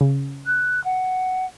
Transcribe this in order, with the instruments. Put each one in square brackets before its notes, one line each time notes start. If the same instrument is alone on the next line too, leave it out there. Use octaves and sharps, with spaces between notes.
[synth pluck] C#3
[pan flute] F#6
F#5